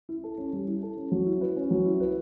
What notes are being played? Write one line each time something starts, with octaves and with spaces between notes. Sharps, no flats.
E4
A4
C#4
G3
E4
A4
C#4
F#3
E4
B4
C#4
F#3
E4
B4